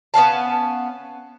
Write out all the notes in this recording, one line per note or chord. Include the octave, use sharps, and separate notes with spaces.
B3 C#4 F5 A5